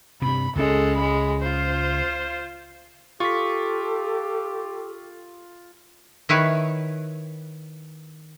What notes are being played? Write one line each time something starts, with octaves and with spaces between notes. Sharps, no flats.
G2 C3 B5
C#2 G#3 C#4 A4
G#3 B5
F4 C5
F4 G4 A4 C#6 B6
D#3 E4 B4 C#5